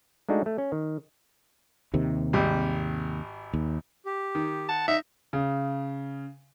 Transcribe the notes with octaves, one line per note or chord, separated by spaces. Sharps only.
G#3 A3 D4 D#4 F#4
A3
C#4
D#3
D#2 C3 D#3
G#1 G3
D#2
G4
D#3
F#5 A5
D#4 E5
C#3